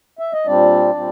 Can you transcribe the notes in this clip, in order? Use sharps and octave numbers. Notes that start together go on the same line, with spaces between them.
E5
D#5
A#2 G3 C4 D4 D5
A#2 G3 C4